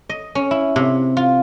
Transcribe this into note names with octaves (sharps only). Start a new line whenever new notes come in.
D#5
C#4
E4
C3
F4